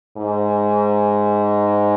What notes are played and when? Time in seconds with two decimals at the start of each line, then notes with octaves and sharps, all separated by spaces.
0.17 G#2